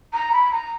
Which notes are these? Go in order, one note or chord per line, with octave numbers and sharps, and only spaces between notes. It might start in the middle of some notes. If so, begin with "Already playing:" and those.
A#5
B5
A#5